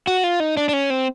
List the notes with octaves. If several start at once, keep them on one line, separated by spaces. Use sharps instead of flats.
F#4
F4
D#4
D4
D4
C#4
C4